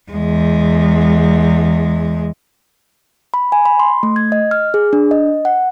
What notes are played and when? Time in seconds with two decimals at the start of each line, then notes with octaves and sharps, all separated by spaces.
0.11 E2 G#3
3.34 B5
3.52 G#5
3.66 B5
3.80 C6
4.03 A3
4.16 G#6
4.32 D#5
4.51 F6
4.74 G#4
4.93 D4
5.11 D#5
5.45 F#5